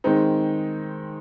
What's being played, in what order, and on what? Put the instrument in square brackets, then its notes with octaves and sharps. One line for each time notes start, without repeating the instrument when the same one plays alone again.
[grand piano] D#3 G#3 C4 D#4